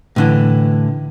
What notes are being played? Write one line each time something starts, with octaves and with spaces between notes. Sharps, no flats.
A2 D3 E3